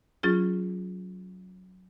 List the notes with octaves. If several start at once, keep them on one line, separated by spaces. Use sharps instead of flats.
F#3 C#4 F4 G#4